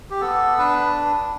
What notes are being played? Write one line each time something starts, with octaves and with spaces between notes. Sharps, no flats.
G4
B3 A4
D4 B4